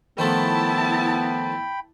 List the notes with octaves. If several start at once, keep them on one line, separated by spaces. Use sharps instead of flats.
D#3 F3 A3 B3 E4 G5 A5 B5